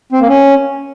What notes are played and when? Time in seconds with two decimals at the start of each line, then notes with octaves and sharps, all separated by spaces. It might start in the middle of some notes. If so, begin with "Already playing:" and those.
0.12 C4
0.21 A#3
0.29 C#4